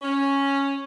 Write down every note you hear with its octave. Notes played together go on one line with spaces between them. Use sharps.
C#4